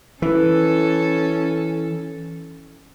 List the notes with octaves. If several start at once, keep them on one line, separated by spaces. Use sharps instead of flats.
E3 C#4 A4